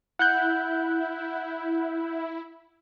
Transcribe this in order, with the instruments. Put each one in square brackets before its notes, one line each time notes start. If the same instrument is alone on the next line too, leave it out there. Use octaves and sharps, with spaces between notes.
[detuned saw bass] E4 [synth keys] F#5 F#6 G6